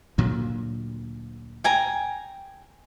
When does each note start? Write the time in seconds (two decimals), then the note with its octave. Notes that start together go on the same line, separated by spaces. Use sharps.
0.18 D2 A#2 F#3
1.64 G5 G#5 A#5